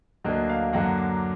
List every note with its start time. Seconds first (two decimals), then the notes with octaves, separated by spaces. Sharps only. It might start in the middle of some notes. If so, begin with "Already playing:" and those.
0.24 D2 D3 F#3 A#3 D#5
0.49 F5
0.73 F#2 D3 F#3 A#3 F#5
0.98 D6